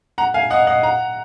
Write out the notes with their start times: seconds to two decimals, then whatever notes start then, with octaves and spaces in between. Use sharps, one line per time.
0.18 F#5 A#5
0.34 F5 G#5
0.50 D#5 F#5
0.67 D#5 F#5
0.83 F#5 A#5